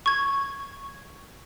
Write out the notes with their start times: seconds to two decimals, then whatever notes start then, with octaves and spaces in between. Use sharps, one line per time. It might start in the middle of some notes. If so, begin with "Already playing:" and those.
0.06 C#6 G#6